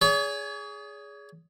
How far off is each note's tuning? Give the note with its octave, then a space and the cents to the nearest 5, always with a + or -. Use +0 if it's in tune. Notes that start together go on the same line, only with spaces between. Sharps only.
G#4 +0 C#5 +45